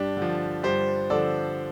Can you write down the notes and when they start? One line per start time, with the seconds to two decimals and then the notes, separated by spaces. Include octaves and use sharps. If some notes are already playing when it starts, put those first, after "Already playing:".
Already playing: G2 D4 G4
0.17 D3
0.22 F3
0.63 G2 G4 C5
1.10 D3 F3 A4 D5